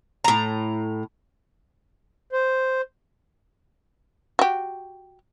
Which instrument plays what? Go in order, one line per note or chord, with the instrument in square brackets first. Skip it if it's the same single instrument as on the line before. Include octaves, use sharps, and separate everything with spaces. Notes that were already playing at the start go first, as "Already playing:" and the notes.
[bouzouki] A2 A#5
[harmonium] C5
[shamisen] F#4 G4